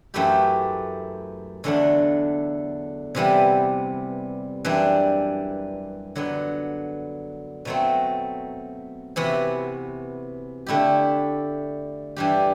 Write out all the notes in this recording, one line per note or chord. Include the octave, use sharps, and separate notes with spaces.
F#2 E3 A3 E4 G4
E2 D3 F#3 A3 D4
C3 E3 G3 B3
F#2 E3 G3 D4
D3 F#3 B3
B2 F#3 A3 C4
C3 E3 B3 F#4
D3 A3 E4 G4
G2 E3 G3 D4 G4